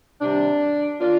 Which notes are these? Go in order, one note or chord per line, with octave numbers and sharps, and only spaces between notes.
C3 D#3 G3 C4 D4
D#3 A#3 D4 F4